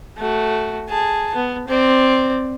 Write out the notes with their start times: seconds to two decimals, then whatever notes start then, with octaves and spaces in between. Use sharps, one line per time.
0.18 A3 F#4
0.89 G#4 A5
1.35 B3
1.68 C4 D5